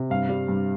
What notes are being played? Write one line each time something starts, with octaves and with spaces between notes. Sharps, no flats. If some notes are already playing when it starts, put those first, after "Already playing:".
Already playing: C3
G2 F5
G3
G2